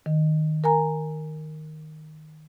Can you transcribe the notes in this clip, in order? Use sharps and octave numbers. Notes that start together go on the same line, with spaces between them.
D#3
A#4 G#5 A#5